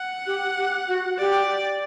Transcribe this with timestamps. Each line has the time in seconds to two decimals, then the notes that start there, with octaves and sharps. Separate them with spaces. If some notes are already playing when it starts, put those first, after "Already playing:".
Already playing: F#5
0.26 G4
0.57 G4
0.88 F#4
1.18 G4 D5